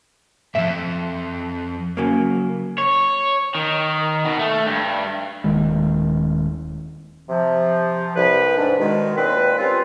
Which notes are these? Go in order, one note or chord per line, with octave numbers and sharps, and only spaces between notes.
F2 G#2 E5
C#3 F#3 A#3
C#5
D#3
B2
A3
G2
D#1 D#3 G#3
C3 F3
C2 B4
G#2 D4
B2 D#3 G#3
D#2 A#2 C4 B4
G3 C4 C#4 F4